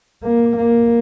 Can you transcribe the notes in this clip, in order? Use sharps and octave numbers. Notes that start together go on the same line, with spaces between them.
A#3
A#3